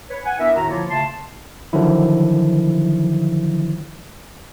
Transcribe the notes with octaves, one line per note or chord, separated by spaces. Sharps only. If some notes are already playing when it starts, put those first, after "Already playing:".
B4 C#5
F#5 G#5
B3 D4 E4 A#4 E5
E2 A2 D#3 F#4 A#5
D3 F3 A#3 E4 F4 C#5
C#3 A3 A5 C6
D3 D#3 F3 F#3 E4